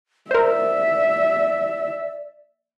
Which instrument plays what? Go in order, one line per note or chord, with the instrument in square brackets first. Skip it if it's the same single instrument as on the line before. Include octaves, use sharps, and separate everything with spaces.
[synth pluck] A#4 C5 [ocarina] D5 [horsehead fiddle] E5